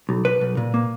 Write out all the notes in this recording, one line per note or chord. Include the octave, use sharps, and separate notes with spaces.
B1
B1 B4
B1
A#2
A#3